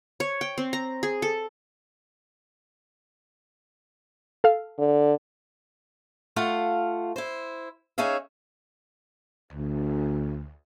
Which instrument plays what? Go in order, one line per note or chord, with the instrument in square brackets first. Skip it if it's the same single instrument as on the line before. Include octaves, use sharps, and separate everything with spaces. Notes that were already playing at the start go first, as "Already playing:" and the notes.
[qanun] C#5
G5
C4
A#5
G#4
A4
[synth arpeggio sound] A4 F5
[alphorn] D3
[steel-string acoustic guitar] A3 F4 F5 F#5
E4 C5
C#4 D#4 G#4 C#5 E5 F5
[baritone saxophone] D2